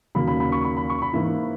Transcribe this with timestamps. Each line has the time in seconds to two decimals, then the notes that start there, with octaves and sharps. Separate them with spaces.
0.15 D#2 C#3 F#3 A#3 B5
0.28 B5
0.40 B5
0.52 C#6
0.64 B5
0.77 B5
0.90 C#6
1.02 B5
1.13 G#2 E3 A#3 E4